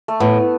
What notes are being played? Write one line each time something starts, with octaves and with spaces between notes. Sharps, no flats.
A3
A2 B3